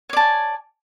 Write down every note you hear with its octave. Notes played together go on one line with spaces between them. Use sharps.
C#5 D5 G#5 A5